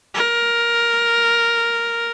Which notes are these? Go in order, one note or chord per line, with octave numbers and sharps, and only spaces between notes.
A#4